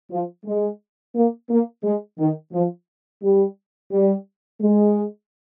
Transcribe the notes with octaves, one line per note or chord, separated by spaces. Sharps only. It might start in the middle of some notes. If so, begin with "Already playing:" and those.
F3
G#3
A#3
A#3
G#3
D#3
F3
G3
G3
G#3